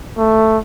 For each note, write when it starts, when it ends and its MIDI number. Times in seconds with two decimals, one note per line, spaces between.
0.17 0.58 57